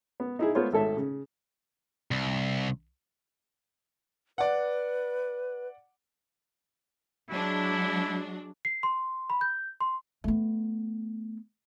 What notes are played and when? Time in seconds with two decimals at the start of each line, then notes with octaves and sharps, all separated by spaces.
0.20 B3
0.39 D#4 E4 G#4
0.55 A3 B3 F4 C5 C#5
0.73 G#1 A3 A4 C#5 E5
0.97 C#3
2.11 C2
4.38 B4 D5 F#5
7.30 F#3 G#3 D4 E4
8.65 C7
8.83 C6
9.30 B5
9.41 G6
9.81 C6
10.24 A3 B3